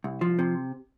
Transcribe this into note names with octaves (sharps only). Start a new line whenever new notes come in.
C2
F3
C3